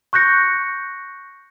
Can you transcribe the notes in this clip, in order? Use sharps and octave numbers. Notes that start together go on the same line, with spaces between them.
C#6 F#6 G6 A#6 C#7